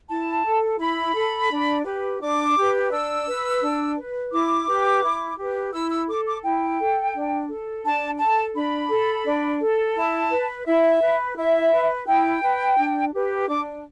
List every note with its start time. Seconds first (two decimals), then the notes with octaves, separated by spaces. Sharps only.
0.09 E4 A5
0.44 A4
0.79 E4 B5
1.15 A4
1.50 D4
1.85 G4 B4
2.21 D4 D6
2.57 G4 B4
2.91 D4 E6
3.26 B4
3.62 D4
3.97 B4
4.32 E4 D6
4.68 G4 B4
5.03 E4
5.38 G4 B4
5.73 E4 E6
5.90 E6
6.08 A4 D6
6.26 D6
6.43 E4 G5
6.79 A4
7.14 D4
7.49 A4
7.84 D4 A5
8.19 A4 A5
8.55 D4 B5
8.89 A4
9.25 D4
9.61 A4
9.96 E4 A5
10.31 B4
10.66 E4 E5
11.01 B4
11.36 E4 E5
11.72 B4
12.06 E4 G5
12.42 B4
12.78 D4
13.13 G4 B4
13.48 D4 D6